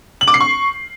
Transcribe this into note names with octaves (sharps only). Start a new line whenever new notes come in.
F#7
D6
C7
C#6